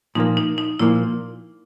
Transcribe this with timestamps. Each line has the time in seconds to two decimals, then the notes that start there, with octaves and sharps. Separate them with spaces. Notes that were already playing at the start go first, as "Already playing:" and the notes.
0.15 A#2 F3 A#3 D#4
0.37 D#4
0.58 D#4
0.79 A#2 F3 A#3 E4